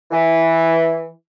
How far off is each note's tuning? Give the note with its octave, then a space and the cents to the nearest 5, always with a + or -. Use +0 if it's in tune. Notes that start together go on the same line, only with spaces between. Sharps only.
E3 -5